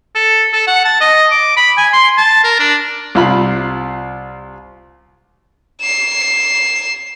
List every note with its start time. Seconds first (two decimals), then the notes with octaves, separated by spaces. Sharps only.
0.15 A4
0.53 A4
0.68 F#5
0.85 A5
1.01 D#5
1.31 D6
1.57 B5
1.78 G#5
1.93 C6
2.18 A5
2.44 A#4
2.59 D4
3.15 C2 F4 B5
5.81 C7 E7